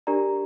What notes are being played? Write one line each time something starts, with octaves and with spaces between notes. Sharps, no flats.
D4 G4 A#4 D5 A#5